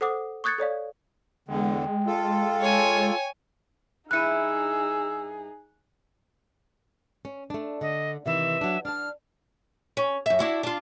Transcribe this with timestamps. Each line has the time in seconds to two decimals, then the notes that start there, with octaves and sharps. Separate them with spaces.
0.01 A4 C5 F#5 D6 D#6
0.44 C#6 D#6 F#6 G#6 A6 C#7
0.58 A4 C#5 D5 F5
1.48 E2 D3 G#3 G5
2.06 F4 A4
2.61 C#5 G#5
4.11 G2 D#4 E4 G#4 E6 F#6 C#7 D#7
7.25 C#4
7.50 A3 D4
7.81 D3 D#5
8.26 C3 D#3 E3 E5
8.61 F#3 D4
8.85 D4 A5 F6
9.97 C#4
10.26 F#2 E5
10.39 D4 E4 F#4
10.63 D4 F4